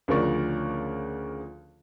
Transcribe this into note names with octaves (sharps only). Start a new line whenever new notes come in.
D2 C#3 F3 A#4 D5 C#6